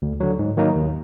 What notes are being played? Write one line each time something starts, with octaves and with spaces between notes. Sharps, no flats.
D2
D3 F#3
G#2
D#3 F#3 A#3 D#4
D#2